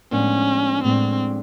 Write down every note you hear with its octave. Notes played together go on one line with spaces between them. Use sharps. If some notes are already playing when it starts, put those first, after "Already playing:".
A2 F3 G#3 B3 C#4 D4
A2 F3 G#3 B3 C4 D4